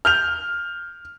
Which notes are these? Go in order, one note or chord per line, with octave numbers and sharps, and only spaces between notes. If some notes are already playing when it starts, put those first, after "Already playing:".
F6 G6 F7